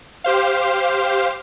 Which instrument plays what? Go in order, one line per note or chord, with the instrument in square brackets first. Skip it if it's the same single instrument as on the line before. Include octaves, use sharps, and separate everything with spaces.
[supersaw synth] G4 C5 F5